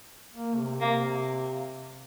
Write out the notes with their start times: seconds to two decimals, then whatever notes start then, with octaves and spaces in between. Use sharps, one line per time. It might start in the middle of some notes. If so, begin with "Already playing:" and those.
0.33 A#3
0.57 C3
0.81 C3 A#3